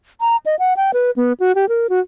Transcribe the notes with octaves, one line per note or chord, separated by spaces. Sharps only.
A#5
D#5
F#5
G5
B4
B3
F#4
G4
A#4
F#4